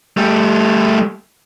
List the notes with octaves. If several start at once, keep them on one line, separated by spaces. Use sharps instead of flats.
G3 A3